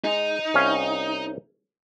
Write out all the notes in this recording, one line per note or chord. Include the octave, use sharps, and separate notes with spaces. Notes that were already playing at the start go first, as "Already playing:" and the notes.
G#3 D#4
C2 C#4 F5